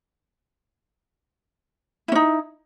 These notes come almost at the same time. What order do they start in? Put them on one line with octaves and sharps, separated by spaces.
E4 C#4 D#4